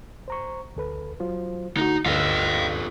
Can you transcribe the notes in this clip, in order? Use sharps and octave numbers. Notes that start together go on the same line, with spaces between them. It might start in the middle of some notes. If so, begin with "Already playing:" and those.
C5 A#5 C#6
D2 A4 B4
F#3 F4 C5
D3 A3 D#4 F#4
D2 G2 F4 A4 B4 D#5 F5